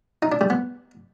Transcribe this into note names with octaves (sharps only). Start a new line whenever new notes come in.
D#4
D4
G3
B3